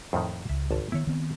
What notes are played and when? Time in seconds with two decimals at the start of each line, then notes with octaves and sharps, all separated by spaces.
0.13 F2 A2 D#3
0.49 C#2 E5
0.71 G#1 A5
0.92 D#3 B3 E4 C#5
1.07 D#3 B3 C4